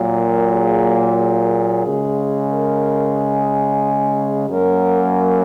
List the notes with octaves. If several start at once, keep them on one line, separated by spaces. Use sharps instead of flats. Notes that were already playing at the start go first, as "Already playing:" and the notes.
Already playing: A#2 F#3 A#3
A#4
G#4
G#4
C#3 G#3
A#4
G#4
F#2 F#3 A#3 A#4